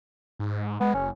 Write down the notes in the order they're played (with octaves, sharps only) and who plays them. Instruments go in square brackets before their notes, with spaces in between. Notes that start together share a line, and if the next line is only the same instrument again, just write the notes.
[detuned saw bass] G#2
[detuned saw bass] G#3 [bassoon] B3
[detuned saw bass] F#1 [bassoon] C#4